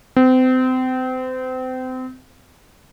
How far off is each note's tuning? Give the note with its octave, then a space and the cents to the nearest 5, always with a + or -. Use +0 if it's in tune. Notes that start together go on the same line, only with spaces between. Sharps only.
C4 -30